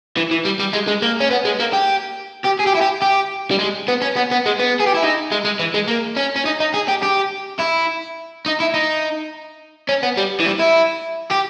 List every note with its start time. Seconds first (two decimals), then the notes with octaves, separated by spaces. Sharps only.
0.17 E3
0.31 E3
0.45 G3
0.59 G3
0.73 G#3
0.88 G#3
1.02 A#3
1.20 C#4
1.30 B3
1.45 G#3
1.60 A#3
1.73 G4
2.44 G4
2.59 G#4
2.66 G4
2.75 E4
2.81 G4
3.02 G4
3.51 G3
3.59 G#3
3.88 B3
4.02 C#4
4.16 B3
4.31 B3
4.46 G#3
4.59 B3
4.80 G#4
4.86 G4
4.94 E4
5.03 D#4
5.32 G#3
5.45 G#3
5.60 E3
5.74 G#3
5.88 A#3
6.16 C#4
6.36 C#4
6.45 D#4
6.60 D#4
6.74 G#4
6.88 G4
7.03 G4
7.60 E4
8.46 D#4
8.60 E4
8.74 D#4
9.89 C#4
10.03 B3
10.17 G3
10.40 E3
10.46 G3
10.60 E4
11.31 G4